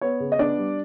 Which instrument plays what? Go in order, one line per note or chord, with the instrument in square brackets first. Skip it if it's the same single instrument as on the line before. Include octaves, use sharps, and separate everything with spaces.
[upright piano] B3 C#5
C#3
D#5
B3 D4 D5
G3